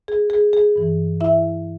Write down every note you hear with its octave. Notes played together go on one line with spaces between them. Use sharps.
G#4
G#4
G#4
G2 E3
E4 E5